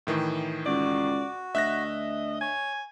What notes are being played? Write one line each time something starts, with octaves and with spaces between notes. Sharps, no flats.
A2 D#3 E3
C#2 F#4 D5
D2 D#5 E5 F#6 A#6
C#5 G#5